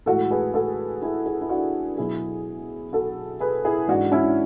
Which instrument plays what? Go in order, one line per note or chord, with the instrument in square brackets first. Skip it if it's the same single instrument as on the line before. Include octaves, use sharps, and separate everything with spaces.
[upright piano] A2 E3 G#3 F#4 A4
G#4 B4
F#4 A4
E4 G#4
E4 G#4
E4
D4 F#4
B2 F#3 E4 G#4
F#4 A4
G#4 B4
E4 G#4
G#2 E3 G#3 D4 F#4
C#4 E4